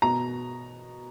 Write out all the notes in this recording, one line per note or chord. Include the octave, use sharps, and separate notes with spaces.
B2 A#5